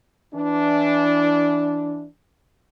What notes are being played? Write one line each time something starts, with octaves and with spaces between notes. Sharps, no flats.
E3 D4